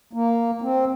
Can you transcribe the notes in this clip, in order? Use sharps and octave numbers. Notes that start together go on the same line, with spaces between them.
A#3
C4